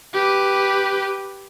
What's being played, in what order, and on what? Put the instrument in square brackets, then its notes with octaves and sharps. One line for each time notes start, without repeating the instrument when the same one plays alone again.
[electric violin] G4 B4